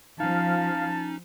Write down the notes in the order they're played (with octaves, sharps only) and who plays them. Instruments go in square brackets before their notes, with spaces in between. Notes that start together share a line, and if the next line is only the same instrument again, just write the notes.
[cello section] F3 [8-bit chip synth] C#4 D#4 [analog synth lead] F5 [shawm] A5